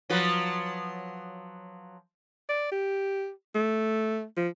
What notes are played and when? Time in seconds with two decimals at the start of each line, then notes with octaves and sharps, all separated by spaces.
0.10 F3 F#3 B4
2.49 D5
2.72 G4
3.55 A3
4.37 F3